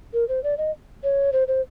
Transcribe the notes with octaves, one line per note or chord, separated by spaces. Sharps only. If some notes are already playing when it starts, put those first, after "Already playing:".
A#4
C5
D5
D#5
C#5
C5
C5